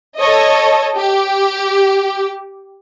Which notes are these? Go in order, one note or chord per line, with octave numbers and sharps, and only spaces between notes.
A4 C#5 D#5
G4